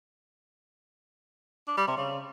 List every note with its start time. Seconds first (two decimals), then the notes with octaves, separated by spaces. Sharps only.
1.68 D4
1.77 G3
1.87 C3
1.97 C#3